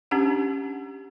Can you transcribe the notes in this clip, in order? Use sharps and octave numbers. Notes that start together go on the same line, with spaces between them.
C#4 D4 G4 F#5